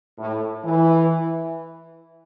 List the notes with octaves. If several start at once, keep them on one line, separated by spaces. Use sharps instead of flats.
A2
E3